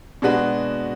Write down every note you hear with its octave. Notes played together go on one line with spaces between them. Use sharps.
B2 G#3 D4 F#4 B4